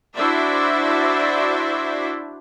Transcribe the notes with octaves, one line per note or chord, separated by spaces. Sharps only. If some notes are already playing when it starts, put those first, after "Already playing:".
D4 E4 F#4 C5 D5 E5